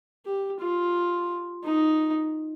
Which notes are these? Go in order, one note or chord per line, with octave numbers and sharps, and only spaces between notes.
G4
F4
D#4